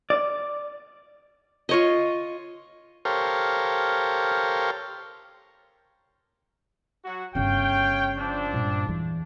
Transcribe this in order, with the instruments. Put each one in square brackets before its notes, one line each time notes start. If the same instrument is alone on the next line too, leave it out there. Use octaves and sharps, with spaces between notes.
[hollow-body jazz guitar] D5
[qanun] F4 C#5 D#5
[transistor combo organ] G4 A4 A#4 C5 C#5 F5
[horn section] F#3 F#4
[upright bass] G1 C#3 [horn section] C#5 F5 G5
[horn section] F3 C4 D4
[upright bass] G2 A#2
E2 E3